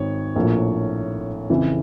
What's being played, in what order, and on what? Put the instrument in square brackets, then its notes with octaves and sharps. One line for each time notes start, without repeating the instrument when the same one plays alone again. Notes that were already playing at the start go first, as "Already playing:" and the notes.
Already playing: [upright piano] G#1 C#5
A#1 A2 F3 A#3
F2 C#3 E3